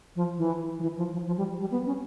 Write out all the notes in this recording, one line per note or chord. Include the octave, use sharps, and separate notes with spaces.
F3
E3
F3
E3
F3
F3
F3
G3
G3
B3
C#4